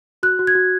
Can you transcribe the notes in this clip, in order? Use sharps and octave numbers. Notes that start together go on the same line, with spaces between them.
F#4 F#6
F#4
G#6
F#4